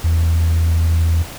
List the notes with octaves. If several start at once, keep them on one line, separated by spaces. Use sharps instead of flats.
E2